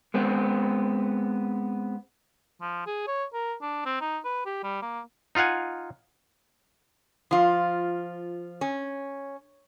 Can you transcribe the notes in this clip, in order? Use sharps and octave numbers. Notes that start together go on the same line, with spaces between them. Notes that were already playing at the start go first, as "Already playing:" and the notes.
G#3 B3 C4
F3
G#4
C#5
A#4
D4
C4
D#4
B4
G4
G3
A#3
D#4 F4 F5 F#5 G#5
F3 F4
C#4